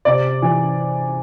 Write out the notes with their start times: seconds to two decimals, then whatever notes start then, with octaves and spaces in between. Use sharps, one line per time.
0.05 C3 D5
0.42 E3